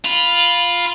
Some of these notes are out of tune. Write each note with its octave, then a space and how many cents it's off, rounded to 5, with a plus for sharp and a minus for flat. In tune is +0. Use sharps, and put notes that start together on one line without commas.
F4 +0 B5 -5